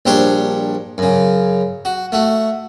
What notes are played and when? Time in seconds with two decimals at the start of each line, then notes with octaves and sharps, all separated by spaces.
0.06 A#1 G3 D4 G4 C5 C#5
0.98 F#2 C#3
1.85 F#4
2.12 A3 F#4